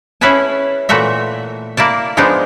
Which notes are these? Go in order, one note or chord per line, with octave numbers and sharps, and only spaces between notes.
C#4 E4 G#4 B4 G#5 A5
A#2 E3 A3 F#4 E5
A#3 E4 D5 A5
F3 G#3 B3 D4 D#4